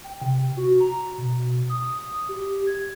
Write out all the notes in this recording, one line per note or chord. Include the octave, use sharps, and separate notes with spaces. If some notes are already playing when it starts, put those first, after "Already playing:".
G5
C3
F#4
A#5
B2
D#6
G4
G#6